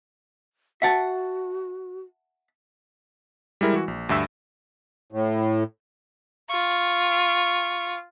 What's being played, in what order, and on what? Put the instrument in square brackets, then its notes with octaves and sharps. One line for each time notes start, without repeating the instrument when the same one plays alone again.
[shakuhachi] F#4 [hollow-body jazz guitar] E5 F#5 A5
[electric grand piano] G3 G#3 E4 A#4
E3 F#4
A#1
D2 G2 E5 E6
[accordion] A2
[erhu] F4 [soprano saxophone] C#6